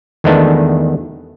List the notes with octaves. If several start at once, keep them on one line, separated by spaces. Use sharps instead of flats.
E2 D#3 G#3 A3 B3 D4